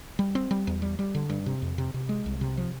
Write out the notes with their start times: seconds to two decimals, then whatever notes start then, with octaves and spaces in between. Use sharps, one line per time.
0.19 G3
0.35 C4
0.51 G3
0.67 E2
0.82 G3
0.99 G3
1.15 D3
1.30 G2
1.46 C3
1.62 F2
1.78 C3
1.94 C3
2.09 G#3
2.26 C2
2.41 C3
2.57 F3